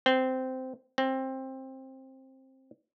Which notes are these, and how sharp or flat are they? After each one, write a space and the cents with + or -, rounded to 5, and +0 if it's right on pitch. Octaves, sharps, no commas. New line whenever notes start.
C4 -15
C4 +15